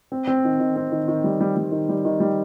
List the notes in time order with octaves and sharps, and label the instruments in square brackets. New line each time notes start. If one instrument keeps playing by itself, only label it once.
[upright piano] C4
C4
D#3
D#3
C4
D#3
D#3
G3
G3
G3
D#3
G3
D#3
G3